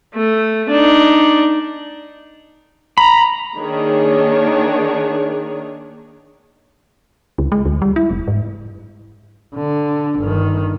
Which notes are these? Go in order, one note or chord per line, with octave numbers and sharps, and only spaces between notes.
A3
D4 D#4
A#5 B5
D#3 A#3 D4 G#4 C#5
C#2
G#3
D2
G3
E4
F1
G#2
D3
G1 D#3